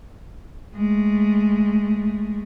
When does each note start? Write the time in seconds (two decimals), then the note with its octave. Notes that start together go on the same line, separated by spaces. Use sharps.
0.75 G#3 A3